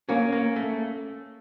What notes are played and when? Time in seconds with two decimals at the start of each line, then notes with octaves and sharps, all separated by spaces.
0.09 A#3 C#4
0.33 A#3
0.56 A3